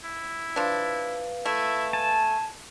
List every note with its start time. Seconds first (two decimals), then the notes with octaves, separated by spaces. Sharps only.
0.04 E4
0.56 F3 D4 B4 F5
1.46 A3 E4
1.93 G#5 A5